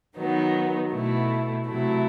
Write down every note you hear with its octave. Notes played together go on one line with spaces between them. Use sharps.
D#3 F#3 B3 D#4
B2 A3 E4
C3 F#3 A3 E4